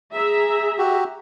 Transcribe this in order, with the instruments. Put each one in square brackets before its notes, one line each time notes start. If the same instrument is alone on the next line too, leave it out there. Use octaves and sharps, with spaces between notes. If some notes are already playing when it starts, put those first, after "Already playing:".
[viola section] G#4 E5 A#5
[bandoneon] F#4 G4